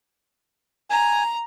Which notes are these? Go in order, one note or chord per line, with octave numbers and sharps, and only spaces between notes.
G#5 A#5